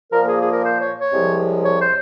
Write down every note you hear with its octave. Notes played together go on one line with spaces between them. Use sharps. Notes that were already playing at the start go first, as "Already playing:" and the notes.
A#2 F3 A#3 A#4
G#4
G#4
A#4
C5
C#5
C#5
C2 C3 F3 G#3
C#5
C5